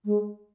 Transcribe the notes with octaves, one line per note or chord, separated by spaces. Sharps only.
G#3